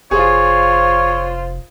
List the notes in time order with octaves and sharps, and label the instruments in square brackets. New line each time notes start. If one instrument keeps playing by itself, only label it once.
[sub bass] F1 [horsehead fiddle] F4 C5 [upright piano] G#4 [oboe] C#5